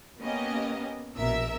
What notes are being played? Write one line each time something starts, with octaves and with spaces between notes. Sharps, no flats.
A#3 B3 C#4 G4 D#5
A#1 B2 A#4 E5 E6